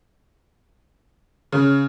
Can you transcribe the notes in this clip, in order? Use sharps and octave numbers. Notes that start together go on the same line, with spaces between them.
C#3